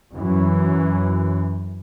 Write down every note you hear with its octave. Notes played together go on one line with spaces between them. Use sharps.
F#2 E3